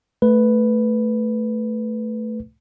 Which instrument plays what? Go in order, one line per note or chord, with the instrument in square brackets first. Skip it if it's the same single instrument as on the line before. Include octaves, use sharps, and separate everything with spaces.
[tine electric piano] A3 B4